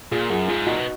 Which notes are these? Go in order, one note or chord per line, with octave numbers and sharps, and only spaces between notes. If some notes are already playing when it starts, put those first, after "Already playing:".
A#2 F4 G#4
F#2 F4 G#4
G#2 F4 G#4
A#2 D#4 F#4
B2